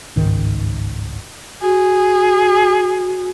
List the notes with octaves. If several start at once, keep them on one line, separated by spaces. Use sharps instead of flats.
G1 C#2 G#2 D#3
F#4 G#4